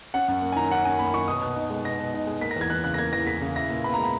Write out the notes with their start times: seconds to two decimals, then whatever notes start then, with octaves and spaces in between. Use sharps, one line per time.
0.14 C#4 F#5
0.28 F#2
0.42 A#3
0.52 G#5
0.56 D#3 A#5
0.71 C#4 F#5
0.85 F#2 G#5
0.99 A#3 B5
1.14 D#3 C#6
1.27 B2 D#6
1.42 B2
1.56 D#4
1.70 G#3
1.85 B2 A#6
1.99 B2
2.14 D#4
2.27 G#3
2.41 A#3 B6
2.51 A#6
2.56 E2
2.61 G#6
2.70 E3 F#6
2.84 C#3 F#6
2.94 A#6
2.98 A#3 G#6
3.13 E2 A#6
3.27 E3 B6
3.41 C#3
3.56 E4 A#6
3.70 A#2
3.84 B3 B5
3.94 G#3 A#5
4.04 B5